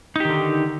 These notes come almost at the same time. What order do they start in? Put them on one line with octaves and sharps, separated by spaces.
D#4 G4 D#3 D3